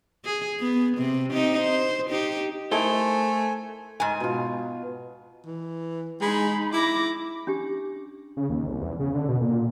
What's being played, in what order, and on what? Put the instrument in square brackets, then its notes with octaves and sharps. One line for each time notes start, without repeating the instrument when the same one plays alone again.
[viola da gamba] G#4
B3
C3
D#4 G4
C5
D#4 G4
[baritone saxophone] A3 [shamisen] D#4 E4 A4 [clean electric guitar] A#4 C5 [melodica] G#5
[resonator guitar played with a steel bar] G#2 G#5
[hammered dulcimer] B2 F4
[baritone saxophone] E3
[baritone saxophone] G#3 [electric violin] D#4 B5
[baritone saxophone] E4 [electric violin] D6 A#6
[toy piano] C#4 D4 G4
[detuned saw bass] C#3
D#2
C2
E2
C#3
D3
B2
A#2